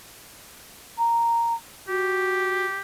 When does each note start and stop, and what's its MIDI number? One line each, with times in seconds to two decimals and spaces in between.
0.98 1.53 82
1.88 2.65 66
1.88 2.82 67